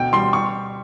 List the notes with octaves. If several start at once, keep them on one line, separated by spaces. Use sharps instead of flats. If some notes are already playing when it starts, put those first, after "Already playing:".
Already playing: D2 B2 G5
G3 C6
C#6